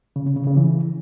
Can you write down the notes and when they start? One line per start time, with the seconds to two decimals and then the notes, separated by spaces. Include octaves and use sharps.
0.16 C#3
0.26 C#4
0.36 C#3
0.47 C#3
0.57 E3